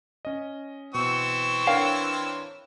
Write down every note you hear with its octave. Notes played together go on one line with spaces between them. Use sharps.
C#4 D#5
B2 E3 C4 C#6 E6
D4 A#4 C#5 F5 G5